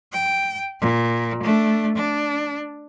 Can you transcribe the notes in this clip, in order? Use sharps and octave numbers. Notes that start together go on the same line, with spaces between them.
G5
A#2
A3 D4
D4